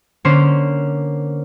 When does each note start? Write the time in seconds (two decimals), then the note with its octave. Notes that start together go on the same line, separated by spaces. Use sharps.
0.25 D3 A#3 C#4 C5